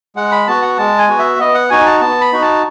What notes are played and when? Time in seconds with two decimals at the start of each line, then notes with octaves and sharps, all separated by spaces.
0.16 G#3 F#5
0.32 B5
0.47 B3 F#4 A5
0.62 F#5
0.78 G#3 A5
0.98 G#5
1.08 B3 F#4
1.19 E5
1.39 B3 D#5
1.54 F#5
1.70 D#4 F#4 G#5
1.86 A5
2.01 B3 A5
2.21 B5
2.32 D#4 F#4
2.42 A5